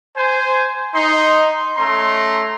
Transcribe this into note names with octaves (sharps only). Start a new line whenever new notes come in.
C5 G#5
D#4 C6
A3 C#4 A#5 C6